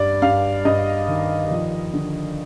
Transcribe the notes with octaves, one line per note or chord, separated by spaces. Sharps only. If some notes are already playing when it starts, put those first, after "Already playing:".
Already playing: G2 D5
G2 F5
G2 D#5
D#3
F3
D3